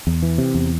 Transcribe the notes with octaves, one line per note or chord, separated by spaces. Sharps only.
E2
E3
C3
E2